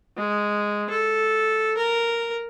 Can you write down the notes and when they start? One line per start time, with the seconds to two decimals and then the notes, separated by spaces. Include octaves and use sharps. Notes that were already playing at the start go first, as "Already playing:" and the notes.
0.17 G#3
0.90 A4
1.77 A#4